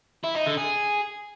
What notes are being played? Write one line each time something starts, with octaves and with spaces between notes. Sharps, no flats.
E4
D#4
D3
G#4